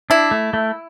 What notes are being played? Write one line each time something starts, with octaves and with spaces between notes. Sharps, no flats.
D4 E4
A3
A3